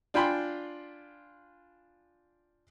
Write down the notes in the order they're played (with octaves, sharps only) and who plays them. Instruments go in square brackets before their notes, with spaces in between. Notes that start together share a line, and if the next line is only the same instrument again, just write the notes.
[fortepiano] D4 F4 G5 G#5 B5 C6